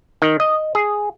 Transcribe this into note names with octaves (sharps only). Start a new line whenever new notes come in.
D#3
D#5
G#4